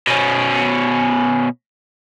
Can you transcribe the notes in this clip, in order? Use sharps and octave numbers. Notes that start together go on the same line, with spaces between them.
B2 C#4